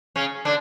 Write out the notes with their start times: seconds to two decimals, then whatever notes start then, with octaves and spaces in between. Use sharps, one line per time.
0.16 C#3 C#4
0.45 D3 D4